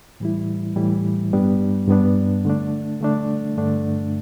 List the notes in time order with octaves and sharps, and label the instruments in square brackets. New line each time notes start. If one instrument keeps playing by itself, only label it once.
[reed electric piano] A2 E3 G3 E4
A2 E3 G3 E4
G2 G3 B3 D4
G2 G3 B3 D4
D3 A3 D4
D3 A3 D4
G2 D3 A3 D4